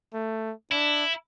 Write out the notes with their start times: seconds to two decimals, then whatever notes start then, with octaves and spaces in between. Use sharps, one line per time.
0.14 A3
0.72 D4 E4